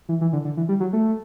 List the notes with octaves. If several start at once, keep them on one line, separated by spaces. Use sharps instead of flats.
E3
E3
D3
D3
E3
G3
F#3
A3